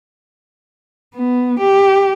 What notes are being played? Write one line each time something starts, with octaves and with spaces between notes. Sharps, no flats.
B3
G4